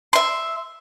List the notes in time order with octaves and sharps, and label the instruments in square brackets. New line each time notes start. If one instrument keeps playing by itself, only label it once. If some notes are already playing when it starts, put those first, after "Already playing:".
[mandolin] E5 C6